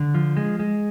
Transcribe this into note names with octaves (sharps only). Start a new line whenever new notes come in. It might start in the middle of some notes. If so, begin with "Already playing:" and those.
Already playing: D3
F3
G#3
G#3